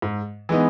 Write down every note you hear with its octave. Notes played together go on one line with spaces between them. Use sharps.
G#2
E3 G#3 B3 D#4